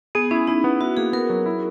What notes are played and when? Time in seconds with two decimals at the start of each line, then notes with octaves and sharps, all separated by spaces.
0.15 B3 G#4
0.31 C#4 E4
0.47 D#4 E4
0.64 B3
0.81 E4 F#4
0.97 A#3 G#4
1.13 B3 A#4
1.30 F#3
1.46 E4